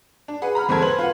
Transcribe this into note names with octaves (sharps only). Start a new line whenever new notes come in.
D4
G#4 B4 F#5
A#5 B5 F6
E2 G#2 C4 A4 A#4 G#6
B4 C5 F#7
F4 B4 F#5